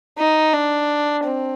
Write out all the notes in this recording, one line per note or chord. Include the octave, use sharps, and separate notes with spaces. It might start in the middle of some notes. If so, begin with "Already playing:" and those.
D#4
D4
C4